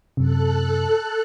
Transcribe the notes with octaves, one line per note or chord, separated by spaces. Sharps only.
F#2 C3 A4 F#6